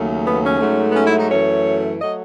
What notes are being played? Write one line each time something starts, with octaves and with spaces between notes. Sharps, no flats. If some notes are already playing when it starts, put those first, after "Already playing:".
Already playing: D#2 C#3 F#3 A3
B3
C#4
G#2 F#3 A3
B3
C#4
E4
D#4
F#2 E3 A3 C#5
F#3 A3 D#5